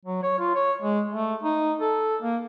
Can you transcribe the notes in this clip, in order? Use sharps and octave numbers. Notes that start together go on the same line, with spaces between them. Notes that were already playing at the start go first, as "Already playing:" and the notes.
F#3
C#5
F4
C#5
G#3
A3
D#4
A4
A#3